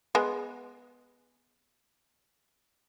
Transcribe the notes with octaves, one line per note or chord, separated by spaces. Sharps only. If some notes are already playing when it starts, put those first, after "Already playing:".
G#3 B3